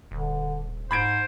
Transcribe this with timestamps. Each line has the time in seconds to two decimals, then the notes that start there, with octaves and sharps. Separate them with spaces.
0.11 D#1 D3
0.91 G#2 C5 B5 G#6 D7